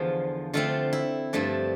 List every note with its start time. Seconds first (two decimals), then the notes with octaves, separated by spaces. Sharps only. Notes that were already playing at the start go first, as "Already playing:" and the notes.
Already playing: E2 D3 F3 F4
0.53 D3 A3 C4 F4
0.93 E4
1.33 G2 F3 A3 D4